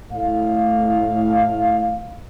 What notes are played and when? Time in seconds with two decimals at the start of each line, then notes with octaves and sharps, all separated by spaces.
0.12 A2 F5